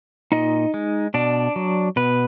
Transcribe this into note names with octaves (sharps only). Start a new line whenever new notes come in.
A#2 D#4 D#5
G#3
B2 D4 D5
F#3
B2 B3 B4